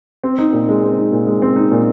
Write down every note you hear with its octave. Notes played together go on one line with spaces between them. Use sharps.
C4
D#4
A#2
G#3
C4
D#4
A#2
G#3
C4
D#4
A#2